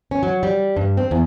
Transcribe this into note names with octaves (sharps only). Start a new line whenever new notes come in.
C#4
F#3
G3
G2
C4
E2